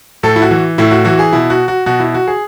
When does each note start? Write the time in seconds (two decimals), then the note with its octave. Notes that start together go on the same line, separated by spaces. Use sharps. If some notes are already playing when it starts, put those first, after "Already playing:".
0.23 A2 A4
0.36 E4
0.42 F#4
0.51 E3
0.78 A2 E4
0.91 F#4
1.05 E3 F#4
1.19 G#4
1.33 B2 E4
1.50 F#4
1.68 F#4
1.86 B2 F#4
2.00 E4
2.14 F#4
2.28 G#4